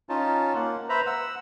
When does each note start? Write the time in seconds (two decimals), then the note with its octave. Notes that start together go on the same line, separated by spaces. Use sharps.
0.09 C#4 D#4 F4 A5
0.55 A#3 F#5
0.89 B4 C5 E5 A#5 B5
1.06 F#5 E6